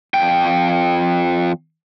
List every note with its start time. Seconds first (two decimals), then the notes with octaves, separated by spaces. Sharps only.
0.14 F2 G5